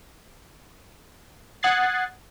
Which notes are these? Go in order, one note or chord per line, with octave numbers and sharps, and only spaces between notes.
F#5 D#6 F#6 G#6 A6 C7